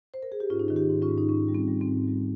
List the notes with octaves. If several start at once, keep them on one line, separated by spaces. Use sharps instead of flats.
C5
A#4
G#4
G4
G#2 C#4 F4
D#4
D#3 F4
D#4 G4
G#2
C#4 F4
G#2
D#4
G#2 C#4
G3
C4
G3
C4
G#2
G3